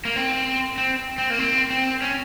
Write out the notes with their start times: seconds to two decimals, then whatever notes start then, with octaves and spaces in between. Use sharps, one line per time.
0.05 A#3
0.16 C4
0.78 C4
1.18 C4
1.30 A#3
1.39 C4
1.70 C4
2.02 C#4